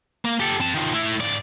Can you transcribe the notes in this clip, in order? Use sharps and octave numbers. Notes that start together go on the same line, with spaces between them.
A#3
G4 A4
C4 A5
D#3 F3
A3 E4
G#2 D5